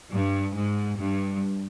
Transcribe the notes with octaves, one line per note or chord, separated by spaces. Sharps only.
G2
G#2
G2